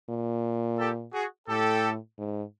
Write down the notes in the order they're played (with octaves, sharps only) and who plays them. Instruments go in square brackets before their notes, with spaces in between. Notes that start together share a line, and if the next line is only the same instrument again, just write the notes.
[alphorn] A#2
[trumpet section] G4 A4
F#4 G#4
[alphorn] A2 [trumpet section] G4 A4
[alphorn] G#2